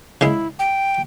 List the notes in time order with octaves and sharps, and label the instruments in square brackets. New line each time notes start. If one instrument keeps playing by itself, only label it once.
[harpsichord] C#3 G#3 [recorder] E4
[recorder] G5